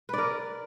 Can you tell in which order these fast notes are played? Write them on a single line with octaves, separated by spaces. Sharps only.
B4 D5 A#4